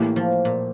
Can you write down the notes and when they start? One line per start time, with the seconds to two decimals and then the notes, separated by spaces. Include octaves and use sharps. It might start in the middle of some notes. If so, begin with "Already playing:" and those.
Already playing: A2 E3 A#3 E4 G4
0.16 F3
0.45 A#2